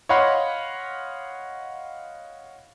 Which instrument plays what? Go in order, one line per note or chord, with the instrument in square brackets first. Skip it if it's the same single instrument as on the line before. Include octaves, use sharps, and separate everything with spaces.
[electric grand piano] C#5 D#5 F5 F#5 B5 C6